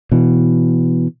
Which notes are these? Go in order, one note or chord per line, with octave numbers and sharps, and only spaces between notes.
B2 E3